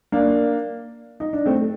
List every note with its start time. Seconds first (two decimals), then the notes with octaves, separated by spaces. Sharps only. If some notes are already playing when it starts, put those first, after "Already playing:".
0.12 A#3 D4
1.20 D#4
1.33 D4
1.46 A3 C4